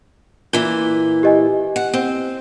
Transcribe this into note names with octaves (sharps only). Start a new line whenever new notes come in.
A#2 E3 G7
G4 D#5 G#5
F#5
C4